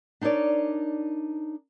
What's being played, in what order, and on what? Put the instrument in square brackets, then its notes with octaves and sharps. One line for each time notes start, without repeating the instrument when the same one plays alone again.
[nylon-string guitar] D4 D#4 A#4 C#5 D5